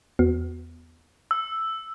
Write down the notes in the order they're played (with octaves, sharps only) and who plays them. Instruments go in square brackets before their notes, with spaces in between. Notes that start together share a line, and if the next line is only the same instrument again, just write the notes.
[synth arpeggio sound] E2 B3 F#4
[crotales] E6